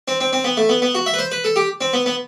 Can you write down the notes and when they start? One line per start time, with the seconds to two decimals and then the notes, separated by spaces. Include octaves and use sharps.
0.08 C4
0.21 C4
0.33 C4
0.44 B3
0.57 A3
0.69 B3
0.82 B3
0.95 F#4
1.06 E5
1.14 B4
1.19 C5
1.32 B4
1.44 A4
1.56 G4
1.81 C4
1.93 B3
2.06 B3